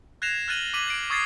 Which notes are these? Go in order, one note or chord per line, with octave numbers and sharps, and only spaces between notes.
F#6 G#6 A#6 C7 E7 F7
F6 F#6 A6 D#7 F#7 G7
D6 B6 D#7 F#7
G#6 C7 D7
C#6 D#6 G#6 A6 C7